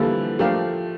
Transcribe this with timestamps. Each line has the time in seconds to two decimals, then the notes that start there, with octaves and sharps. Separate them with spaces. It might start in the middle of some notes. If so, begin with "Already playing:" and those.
Already playing: D3 E3 F3 G3 A#3 E4 A4
0.39 F3 A3 D4 G4 A#4 F5